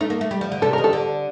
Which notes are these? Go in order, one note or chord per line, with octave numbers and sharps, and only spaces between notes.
A3 D#4
A#3
A3
G3
F3
D3
C3 A4
D#3 A#4
A4
D3